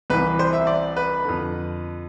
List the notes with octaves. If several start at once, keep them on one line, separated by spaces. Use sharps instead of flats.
C2 C3 E3 B4
C5
E5
D5
B4
F2 D3